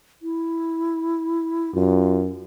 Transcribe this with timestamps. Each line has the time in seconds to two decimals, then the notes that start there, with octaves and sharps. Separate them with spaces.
0.22 E4
1.75 F#2 F4